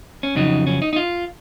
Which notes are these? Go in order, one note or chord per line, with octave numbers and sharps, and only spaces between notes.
C#4
F2 C#3 F#3 D#4
C#4
D#4
D#4
F4